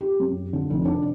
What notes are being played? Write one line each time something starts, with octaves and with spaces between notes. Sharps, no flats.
G4
F#2
D3
F1
D4